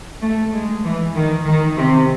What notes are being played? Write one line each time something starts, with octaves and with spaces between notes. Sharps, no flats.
A3
G#3
E3
D#3
D#3
C3